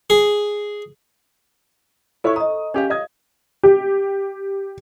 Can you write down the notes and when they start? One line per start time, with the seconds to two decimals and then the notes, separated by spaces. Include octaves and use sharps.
0.10 G#4
2.24 E4 A4 C5 C#5 E5 C#6
2.36 D#5 A#5 D#6
2.74 C#4 G4 C#5 F5
2.90 D#5 D#6 G#6
3.63 G4